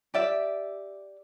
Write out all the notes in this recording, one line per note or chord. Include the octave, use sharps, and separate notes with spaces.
G4 D5 E5